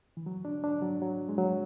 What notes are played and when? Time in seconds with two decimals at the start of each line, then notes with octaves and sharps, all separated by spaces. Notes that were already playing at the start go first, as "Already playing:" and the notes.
0.17 E3
0.26 F#3
0.45 D4
0.64 D4
0.82 F#3
1.02 F#3
1.29 G#3
1.38 F#3